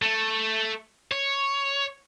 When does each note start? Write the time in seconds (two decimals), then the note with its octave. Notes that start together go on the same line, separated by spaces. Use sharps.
0.02 A3
1.12 C#5